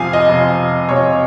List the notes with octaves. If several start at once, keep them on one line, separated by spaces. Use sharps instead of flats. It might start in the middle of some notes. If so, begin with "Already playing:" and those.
Already playing: F2 C3 F3 F5 G#5
D#5
F2 C3 F3
F2 C3 F3 C#5